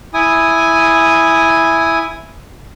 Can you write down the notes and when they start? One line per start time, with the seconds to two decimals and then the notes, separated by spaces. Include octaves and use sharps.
0.14 E4 G#5 D#6